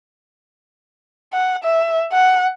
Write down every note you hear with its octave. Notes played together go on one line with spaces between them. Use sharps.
F#5
E5
F#5